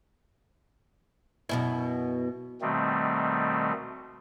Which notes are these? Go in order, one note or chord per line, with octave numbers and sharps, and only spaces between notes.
F#2 B2 E4
B2 D#3 G3 A3 C4